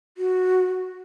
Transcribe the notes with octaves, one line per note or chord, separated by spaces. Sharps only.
F#4